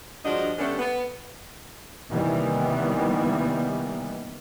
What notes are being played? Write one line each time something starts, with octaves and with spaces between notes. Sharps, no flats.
G2 F3 G#3 D4 F#4 D#5
D3 G3 A3 B3 C#4 D4
B3
C3 D#3 E3 G3 A#3 B3